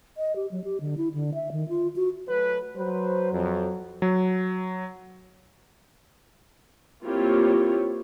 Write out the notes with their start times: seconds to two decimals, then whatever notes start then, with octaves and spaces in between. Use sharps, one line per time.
0.17 D#5
0.36 G4
0.51 F#3
0.64 G4
0.81 D3
0.98 E4
1.14 D3
1.34 E5
1.52 D#3
1.69 F4
1.96 F#4
2.28 F#3 A3 B4
2.77 F#3 B4 C5
3.32 F2
4.02 F#3
7.04 A#3 C4 E4 F4 G4 C#5